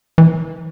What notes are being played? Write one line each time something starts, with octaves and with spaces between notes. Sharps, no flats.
E3